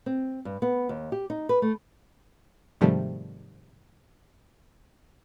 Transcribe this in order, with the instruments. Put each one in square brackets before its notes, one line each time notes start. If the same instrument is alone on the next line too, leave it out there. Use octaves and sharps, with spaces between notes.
[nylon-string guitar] C4
G2
B3
D#2
G4
D#4
B4
A3
[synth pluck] G#2 C3 D#3 F3 G3 A3